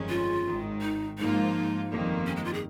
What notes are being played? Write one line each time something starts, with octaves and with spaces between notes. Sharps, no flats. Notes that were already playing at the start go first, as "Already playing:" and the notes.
Already playing: G1 F2 D#3 G#3 C#4
F4
G#1 G#2 D#3
D#4
G#2 F3 A#3 D#4 F4
G1 F2 D#3 G3 A#3
C#4
G#3
F4
G#4